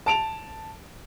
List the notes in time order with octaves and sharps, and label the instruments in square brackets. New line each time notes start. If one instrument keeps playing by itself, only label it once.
[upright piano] A5 D7 F7